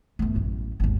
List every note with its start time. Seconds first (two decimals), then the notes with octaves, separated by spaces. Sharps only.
0.19 G1 A3
0.35 A1 F#2
0.80 G#1 D#2